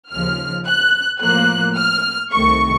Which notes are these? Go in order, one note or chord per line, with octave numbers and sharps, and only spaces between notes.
D#2 C#3 F3 F6
F#6
A2 F3 A#3 F#6
F6
C2 C3 D#3 A3 C#6